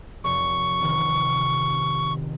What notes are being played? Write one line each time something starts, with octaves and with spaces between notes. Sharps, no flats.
F1 C#6
C3 D#3 B3